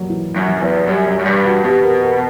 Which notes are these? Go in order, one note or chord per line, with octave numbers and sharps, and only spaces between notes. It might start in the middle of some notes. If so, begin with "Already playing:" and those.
Already playing: F#3 G3 A#3
E3
F#2
F#3
E2
F#2 G3
G3
F#2
G2 G3
F#4
B2 G4
A#4
A#4